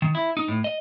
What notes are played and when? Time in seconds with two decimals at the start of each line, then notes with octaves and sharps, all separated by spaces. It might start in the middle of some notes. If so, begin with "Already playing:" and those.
0.02 D#3
0.15 E4
0.37 D#4
0.48 A2
0.64 D#5